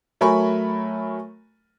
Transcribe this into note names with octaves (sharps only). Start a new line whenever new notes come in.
F#3 A3 A#4 G#5 B5 C#6